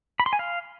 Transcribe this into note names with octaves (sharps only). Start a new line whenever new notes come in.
B5
C6
G#5
F5